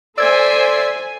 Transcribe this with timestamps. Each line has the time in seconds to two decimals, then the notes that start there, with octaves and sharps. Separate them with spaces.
0.18 A4 C5 D5 E5 G#5 E6 G#6